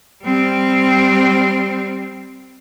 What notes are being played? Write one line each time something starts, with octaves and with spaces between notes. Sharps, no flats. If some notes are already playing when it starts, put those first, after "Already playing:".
G3 C4